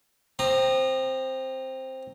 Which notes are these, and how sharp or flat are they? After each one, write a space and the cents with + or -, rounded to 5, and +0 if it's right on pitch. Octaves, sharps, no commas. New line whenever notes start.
C4 +5 A#5 +0 D#6 -35